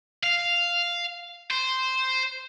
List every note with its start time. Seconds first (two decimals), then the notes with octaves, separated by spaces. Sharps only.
0.23 F5
1.51 C5